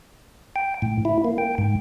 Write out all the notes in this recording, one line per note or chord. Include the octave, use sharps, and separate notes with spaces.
G5
A2
E4
A#3
G5
G#2